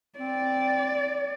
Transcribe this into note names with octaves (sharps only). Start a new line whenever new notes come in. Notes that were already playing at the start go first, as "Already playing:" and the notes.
C4 D5